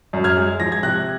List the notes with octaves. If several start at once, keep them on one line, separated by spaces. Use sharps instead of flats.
F#2
F6 G#6
G#3
F3 A#6
G#6
C3 F#6 A#6